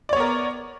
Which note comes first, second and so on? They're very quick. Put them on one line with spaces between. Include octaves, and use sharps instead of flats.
D5 C#5 B3 A#4